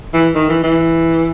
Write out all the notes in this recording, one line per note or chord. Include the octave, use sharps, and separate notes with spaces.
E3
D#3
E3
E3